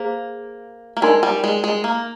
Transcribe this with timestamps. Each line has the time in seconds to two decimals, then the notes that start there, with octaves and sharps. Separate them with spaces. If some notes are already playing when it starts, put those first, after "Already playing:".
Already playing: A#3 G#4 C5 F5
0.97 A#3
1.02 G#3 D#4 A#4 D5 G#5 C6
1.23 G3
1.44 G#3
1.64 G#3
1.84 A#3